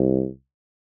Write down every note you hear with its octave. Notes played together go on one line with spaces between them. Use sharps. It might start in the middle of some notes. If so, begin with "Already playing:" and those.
Already playing: C2